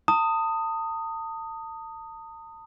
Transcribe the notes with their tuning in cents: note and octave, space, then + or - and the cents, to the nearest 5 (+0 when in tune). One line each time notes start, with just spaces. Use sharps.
A5 +40 D#6 +0